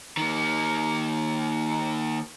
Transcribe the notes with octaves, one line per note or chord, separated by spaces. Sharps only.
D#3 A#3